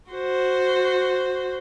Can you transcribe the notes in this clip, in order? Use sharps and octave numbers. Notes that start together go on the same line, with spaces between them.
F#4 C5